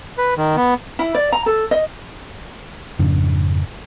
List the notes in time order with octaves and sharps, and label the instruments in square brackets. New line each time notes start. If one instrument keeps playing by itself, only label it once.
[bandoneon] B4
D#3
B3
[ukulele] E4
D5
A#5
A4
D#5
[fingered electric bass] F2 G#2 C#3 D4